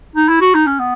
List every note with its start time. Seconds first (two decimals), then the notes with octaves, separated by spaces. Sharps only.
0.16 D#4
0.28 E4
0.41 F#4
0.54 D#4
0.66 C#4
0.79 B3